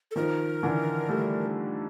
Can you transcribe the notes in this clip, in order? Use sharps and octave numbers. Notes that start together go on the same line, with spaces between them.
A4
D#3 F3 A#4
D3 E3
G3 A3